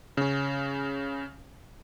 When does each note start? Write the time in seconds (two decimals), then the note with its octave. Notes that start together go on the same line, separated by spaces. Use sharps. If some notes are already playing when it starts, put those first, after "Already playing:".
0.17 C#3 C#4